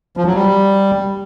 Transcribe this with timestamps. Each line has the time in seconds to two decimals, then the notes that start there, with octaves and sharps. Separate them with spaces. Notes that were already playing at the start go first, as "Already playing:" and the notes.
0.17 F3
0.26 F#3
0.35 G3